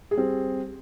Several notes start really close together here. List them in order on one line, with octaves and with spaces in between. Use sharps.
G#4 G3 C4